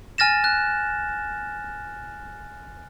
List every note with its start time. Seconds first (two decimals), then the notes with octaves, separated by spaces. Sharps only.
0.18 G#5 F6 A6 A#6 E7
0.44 F#6